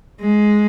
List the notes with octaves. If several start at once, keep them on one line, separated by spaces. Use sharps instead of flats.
G#3